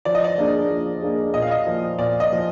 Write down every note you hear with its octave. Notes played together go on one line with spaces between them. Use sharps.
F3 D5
D#5
D5
A#3 D4 G#4
F3
A#3 D4 G#4
A#2 D#5
F5
D#5
F3 A#3
A#2 D5
D#5
F3 A#3